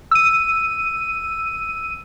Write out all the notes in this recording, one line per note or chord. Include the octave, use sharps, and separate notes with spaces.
E6 D#7